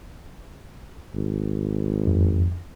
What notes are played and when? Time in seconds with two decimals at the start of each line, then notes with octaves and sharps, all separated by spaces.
1.15 G#1
2.07 F2